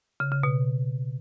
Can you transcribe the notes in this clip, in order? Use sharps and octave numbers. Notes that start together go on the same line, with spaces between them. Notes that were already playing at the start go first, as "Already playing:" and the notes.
C#3
C#3
B2